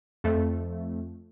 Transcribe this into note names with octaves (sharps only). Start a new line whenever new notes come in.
F2 A3